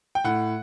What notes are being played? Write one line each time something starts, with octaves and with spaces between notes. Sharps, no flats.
G5
A2 F#5